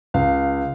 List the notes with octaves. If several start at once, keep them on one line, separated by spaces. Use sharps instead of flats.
C#2 F5